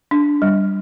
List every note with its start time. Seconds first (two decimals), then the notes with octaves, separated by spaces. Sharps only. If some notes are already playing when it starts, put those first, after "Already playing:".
0.11 D4
0.42 G3